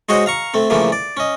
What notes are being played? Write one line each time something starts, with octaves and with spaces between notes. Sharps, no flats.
G#3 F#4 C5 C#5 D#5 F#5
F5 A#5 C#6
A3 C4
C#3 E3 F3 A3 A#3
D5
C#4 D#5